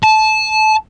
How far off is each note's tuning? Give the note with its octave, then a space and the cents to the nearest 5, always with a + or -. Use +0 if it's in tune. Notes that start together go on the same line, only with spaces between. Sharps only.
A5 -20